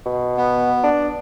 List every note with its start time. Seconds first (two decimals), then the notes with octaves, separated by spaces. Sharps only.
0.06 B2
0.37 B3
0.84 D4